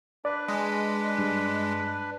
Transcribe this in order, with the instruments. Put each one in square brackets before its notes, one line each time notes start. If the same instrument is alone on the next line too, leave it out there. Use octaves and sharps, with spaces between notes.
[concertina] D4 B4 [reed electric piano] D5
[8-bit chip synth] G#3 [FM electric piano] G#4 D#5
[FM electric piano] G2